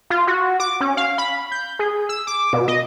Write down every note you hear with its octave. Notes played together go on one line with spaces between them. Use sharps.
F4
F#4
D6
C#4
F5
B5
G6
G#4
E6
D6
B2
D#5